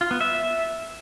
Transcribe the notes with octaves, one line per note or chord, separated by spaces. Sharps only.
F4
B3
E5